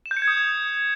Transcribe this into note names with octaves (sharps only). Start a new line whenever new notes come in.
E7
G6
C#7
G#6
D#6